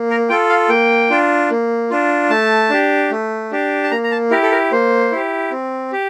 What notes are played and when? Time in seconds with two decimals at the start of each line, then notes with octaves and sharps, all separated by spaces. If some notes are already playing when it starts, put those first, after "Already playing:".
Already playing: A#3
0.10 A#4
0.29 F4 A4 G5
0.49 F5
0.69 A#3 G5
1.10 D4 F4
1.50 A#3
1.90 D4 F4
2.30 A3 A5
2.70 D4 G4
3.11 A3
3.51 D4 G4
3.84 A5
3.91 A#3 A#5
4.04 A#5
4.11 A5
4.31 E4 G4 A#4
4.43 A4
4.52 A#4
4.72 A#3 C5
5.12 E4 G4
5.51 C4
5.92 G4